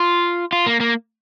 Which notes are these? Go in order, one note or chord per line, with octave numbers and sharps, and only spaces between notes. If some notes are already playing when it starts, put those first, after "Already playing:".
Already playing: F4
F4
A#3
A#3